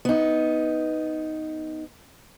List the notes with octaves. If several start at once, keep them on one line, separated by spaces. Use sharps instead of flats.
B3 D#4